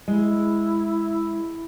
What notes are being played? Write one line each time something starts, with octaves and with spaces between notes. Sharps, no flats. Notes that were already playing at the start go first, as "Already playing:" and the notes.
G#3 E4